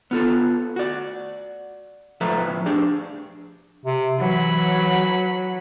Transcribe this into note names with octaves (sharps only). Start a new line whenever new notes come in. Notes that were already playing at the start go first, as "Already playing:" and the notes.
B3 F4 A4
F#4 D5
A2 F3 A4 B4 E5 A#5
D4 G4 G#4
C3
E3 F#3 B5